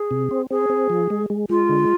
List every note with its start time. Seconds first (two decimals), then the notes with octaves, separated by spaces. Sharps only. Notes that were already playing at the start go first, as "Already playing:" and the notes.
Already playing: G#4
0.11 C3
0.31 C4
0.50 C4 G#4
0.70 C4
0.90 F3
1.10 G#3
1.30 G#3
1.49 G#3 F4
1.69 D3